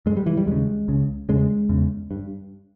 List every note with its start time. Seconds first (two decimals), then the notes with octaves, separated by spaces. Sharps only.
0.06 G2 G#3
0.17 G3
0.26 E3
0.37 G3
0.47 D#2 C#3 G#3
0.88 C#2 C#3
1.29 E2 C#3 G#3
1.69 E2 C#3
2.11 G2